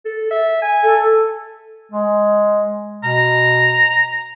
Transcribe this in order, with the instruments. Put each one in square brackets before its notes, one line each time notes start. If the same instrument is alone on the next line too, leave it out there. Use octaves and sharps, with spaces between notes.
[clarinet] A4
E5
G#5
[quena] A4
[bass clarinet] G#3
[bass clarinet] B2 [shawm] A#5